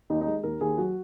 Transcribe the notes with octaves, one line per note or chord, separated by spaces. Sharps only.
D#2 D#4
D#4
G#3
D#2 A#4
D#2 G#4
F#3 F#4